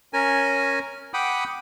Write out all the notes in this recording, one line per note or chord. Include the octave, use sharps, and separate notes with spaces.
C#4 A#4 G#5
F#5 G5 B5 D6 D#6